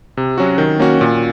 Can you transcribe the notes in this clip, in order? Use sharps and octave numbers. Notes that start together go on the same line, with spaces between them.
C3
F#3 C#4 F#4
D#3
A#3 C#4 F#4
A#2